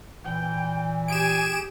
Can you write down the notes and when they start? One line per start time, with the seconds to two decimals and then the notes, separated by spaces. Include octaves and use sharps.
0.25 A#2 E3 G5
1.08 G4 G#4 G#5 D7 E7